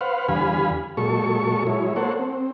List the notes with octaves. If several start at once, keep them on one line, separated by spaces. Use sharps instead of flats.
B4 C5 F5 F#5
E2 D3 G3 F5 G#5 B5
A#2 F#3 G#3 A4 C#6
F#3 G#3 E4 C#5
A#3 A4 C5 C#5 F#5
C4